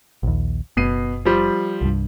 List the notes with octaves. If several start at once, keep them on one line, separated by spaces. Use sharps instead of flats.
A#1 D#2
F#1 B2 C7 D#7
F3 G3 C5
C2 G2